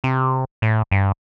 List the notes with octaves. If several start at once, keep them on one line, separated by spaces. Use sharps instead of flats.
C3
A2
G2